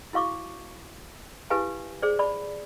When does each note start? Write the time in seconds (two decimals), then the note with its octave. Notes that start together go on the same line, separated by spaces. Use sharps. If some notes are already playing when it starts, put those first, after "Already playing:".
0.13 E4 F#4 F5 C#6 D6
1.50 E4 G4 B4 F5 G#5 A5
2.02 G#4 C5 D5
2.19 D5 A5 B5